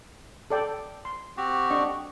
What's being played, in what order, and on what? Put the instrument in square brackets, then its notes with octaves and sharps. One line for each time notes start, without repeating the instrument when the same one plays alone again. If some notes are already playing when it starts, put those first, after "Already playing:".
[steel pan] A4 D5 G5
C6
[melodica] C4 F#4 G4
[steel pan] D4 D#5 C#6